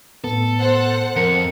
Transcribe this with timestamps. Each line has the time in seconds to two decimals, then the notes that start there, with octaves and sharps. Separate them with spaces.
0.24 A2 B3 A4
0.59 C5 F#5
1.16 F2 A#4 C#7